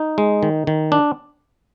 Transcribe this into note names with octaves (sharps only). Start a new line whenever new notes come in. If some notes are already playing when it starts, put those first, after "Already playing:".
Already playing: D#4
G#3
D#3
D#3
D4